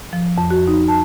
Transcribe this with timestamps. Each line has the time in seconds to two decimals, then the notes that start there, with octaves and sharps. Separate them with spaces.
0.13 F3
0.38 F2
0.51 F#4
0.68 D#4
0.88 A5